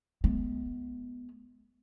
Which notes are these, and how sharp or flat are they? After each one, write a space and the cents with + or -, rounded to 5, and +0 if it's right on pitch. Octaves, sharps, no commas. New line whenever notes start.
G#3 +35 B3 +0